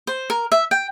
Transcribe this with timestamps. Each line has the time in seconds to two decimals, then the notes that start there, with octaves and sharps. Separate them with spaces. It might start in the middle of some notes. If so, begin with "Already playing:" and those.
0.07 C5
0.30 A#4
0.52 E5
0.71 G5